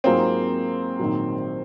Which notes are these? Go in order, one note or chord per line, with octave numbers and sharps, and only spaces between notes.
G#2 F#3 A#3 C4 F4 G#4
A#1 G#2 D#3 F#3